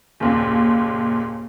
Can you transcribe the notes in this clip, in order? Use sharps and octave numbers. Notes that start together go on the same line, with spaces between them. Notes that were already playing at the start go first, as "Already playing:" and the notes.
F#1 D#2 A#2